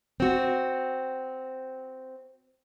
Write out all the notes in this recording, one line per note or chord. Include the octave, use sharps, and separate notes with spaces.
C4 F#4